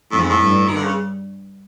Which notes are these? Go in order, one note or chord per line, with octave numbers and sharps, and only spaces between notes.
F2 A2
G#2
A2
G2
D#3
D3
C#3